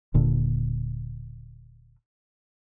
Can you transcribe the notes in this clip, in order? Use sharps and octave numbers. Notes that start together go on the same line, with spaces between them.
D#1 A#2 D3